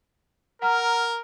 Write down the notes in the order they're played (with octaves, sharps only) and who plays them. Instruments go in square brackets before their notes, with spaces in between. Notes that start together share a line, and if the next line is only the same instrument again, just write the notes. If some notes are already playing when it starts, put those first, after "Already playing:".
[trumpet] A#4 [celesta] F#5 A#5 F6